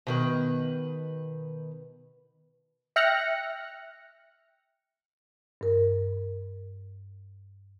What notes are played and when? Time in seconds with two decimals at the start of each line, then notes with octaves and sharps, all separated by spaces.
0.07 B2 D#3 B4
2.96 E5 G5 F6 F#6 A#6 C#7
5.61 G2 A#4